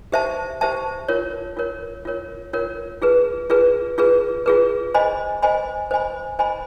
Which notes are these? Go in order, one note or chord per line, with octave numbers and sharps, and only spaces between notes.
G4 C5 E5 A5
G4 C5 E5 A5
F4 A#4 C#5
F4 A#4 C#5
F4 A#4 C#5
F4 A#4 C#5
F4 G#4 B4
F4 G#4 B4
F4 G#4 B4
F4 G#4 B4
C5 D#5 G#5 B5
C5 D#5 G#5 B5
C5 D#5 G#5 B5
C5 D#5 G#5 B5